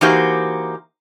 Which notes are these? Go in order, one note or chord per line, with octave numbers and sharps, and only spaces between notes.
E3 A#3 D#4 F#4 G4 C5